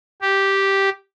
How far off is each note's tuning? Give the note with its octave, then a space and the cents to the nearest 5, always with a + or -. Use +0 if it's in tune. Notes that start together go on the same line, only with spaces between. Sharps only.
G4 -5